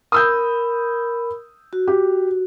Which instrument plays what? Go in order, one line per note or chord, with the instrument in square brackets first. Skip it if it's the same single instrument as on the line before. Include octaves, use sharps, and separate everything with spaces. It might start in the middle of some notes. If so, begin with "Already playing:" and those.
[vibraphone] A#4 B5 [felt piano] D#6 E6 G6
[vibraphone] F#4
[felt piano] G4